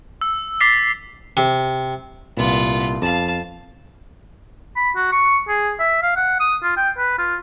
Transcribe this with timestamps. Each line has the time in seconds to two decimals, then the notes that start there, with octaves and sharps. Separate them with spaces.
0.21 E6
0.60 D6 E6 A6 B6 C7 G7
1.37 C3
2.37 C2 A#2 B3 F4
3.02 F2 F5 A5
4.76 B5
4.96 F#4
5.12 C#6
5.48 G#4
5.80 E5
6.03 F5
6.16 F#5
6.40 D#6
6.63 F4
6.77 G5
6.98 B4
7.18 F4